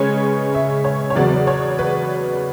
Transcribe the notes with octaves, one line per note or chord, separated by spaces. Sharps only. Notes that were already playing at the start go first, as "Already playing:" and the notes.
Already playing: C#3 G#3 C#4 B4 C#5
E5
C#5
C#5
E2 C#3 F#3 B3 D5
C#5
B4